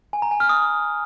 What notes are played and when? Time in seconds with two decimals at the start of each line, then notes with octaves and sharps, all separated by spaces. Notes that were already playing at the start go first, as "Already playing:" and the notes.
0.13 G#5
0.22 A#5
0.31 G#5
0.40 F6
0.49 D#6